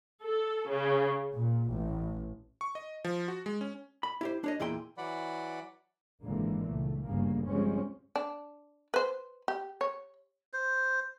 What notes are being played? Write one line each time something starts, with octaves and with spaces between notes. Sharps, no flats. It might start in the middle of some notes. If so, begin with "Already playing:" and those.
A4
C#3
A#2
A1
C#6
D#5
F3
F#4
G#3
C#4
B5
E4 G4 C5
D4 C#5 D#5
E2 A#2 E4 G#4 G5 C6
E3 F#3 D5 F#5 B5
G#1 A#2 D3 E3 G#3 A#3
C#2 A3
G1 D2 G2 C#3 A#3
F3 G3 G#3 C4 C#4
D4
B4 C5
G4
C#5
C5